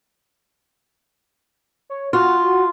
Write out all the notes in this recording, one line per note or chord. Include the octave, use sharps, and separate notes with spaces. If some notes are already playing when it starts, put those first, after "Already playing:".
C#5
F4 F#4